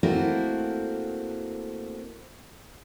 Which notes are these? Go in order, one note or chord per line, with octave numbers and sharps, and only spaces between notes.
A3 A#3 C4 E4 F#4 A#4